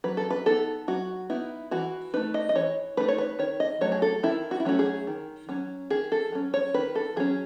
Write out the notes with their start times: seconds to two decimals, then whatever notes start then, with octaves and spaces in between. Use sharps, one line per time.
0.04 F#3 B4
0.17 A4
0.30 B4
0.46 B3 D#4 A4
0.88 F#3 F#4
1.30 B3 D#4 E4
1.71 E3 F#4
2.14 A3 D#4 B4
2.34 D#5
2.49 D#5
2.55 E3 C#5
2.97 A3 D#4 B4
3.08 C#5
3.18 B4
3.39 D#3 C#5
3.60 D#5
3.81 F#3 A3 C#5
3.92 G#4
4.02 A4
4.23 D#3 E4
4.51 F#4
4.60 E4
4.65 F#3 A3 C#4 F#4
4.79 G#4
5.07 D#3
5.49 F#3 C#4
5.90 D#3 G#4
6.12 A4
6.32 F#3 C#4
6.54 C#5
6.74 D#3 B4
6.95 A4
7.16 F#3 C#4 G#4